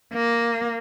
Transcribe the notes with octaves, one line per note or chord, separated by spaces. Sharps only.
A#3